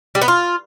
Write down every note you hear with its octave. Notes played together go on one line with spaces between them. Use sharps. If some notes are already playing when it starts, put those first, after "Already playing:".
G3
B3
F4